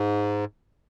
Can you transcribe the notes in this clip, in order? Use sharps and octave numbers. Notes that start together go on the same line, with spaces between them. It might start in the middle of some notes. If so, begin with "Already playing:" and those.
Already playing: G#2